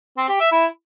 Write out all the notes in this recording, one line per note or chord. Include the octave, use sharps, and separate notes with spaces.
C4
G4
E5
E4